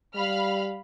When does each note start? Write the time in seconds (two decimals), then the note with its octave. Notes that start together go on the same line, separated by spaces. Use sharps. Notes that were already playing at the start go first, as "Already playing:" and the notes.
0.15 G3 F5 B5 F6